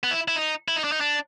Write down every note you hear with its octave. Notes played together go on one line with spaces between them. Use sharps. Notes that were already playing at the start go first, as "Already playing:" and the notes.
B3
E4
E4
D#4
E4
D#4
D4
D#4
D4